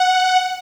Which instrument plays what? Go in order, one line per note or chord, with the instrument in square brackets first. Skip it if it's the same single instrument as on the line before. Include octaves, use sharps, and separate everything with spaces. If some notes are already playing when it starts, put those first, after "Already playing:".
Already playing: [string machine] F#5